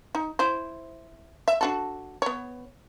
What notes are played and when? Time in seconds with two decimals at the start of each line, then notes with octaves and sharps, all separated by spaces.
0.15 D#4
0.39 E4 C5
1.48 E5
1.61 D4 F#4 A4
2.22 B3 C#5